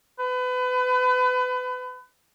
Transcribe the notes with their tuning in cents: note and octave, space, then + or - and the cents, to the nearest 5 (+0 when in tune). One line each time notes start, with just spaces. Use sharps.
B4 +30